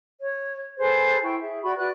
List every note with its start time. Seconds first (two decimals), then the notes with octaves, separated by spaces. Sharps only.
0.21 C#5
0.77 G#4 A4 B4 C5
1.23 E4 G5 C#6
1.40 G#4 E5
1.63 F#4 D5 B5 C#6
1.77 F#4 B4 D5 F#6